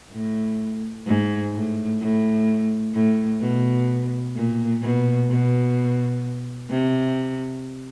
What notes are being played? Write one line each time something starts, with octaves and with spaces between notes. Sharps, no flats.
A2
G#2
A2
A2
A2
B2
A#2
B2
B2
C3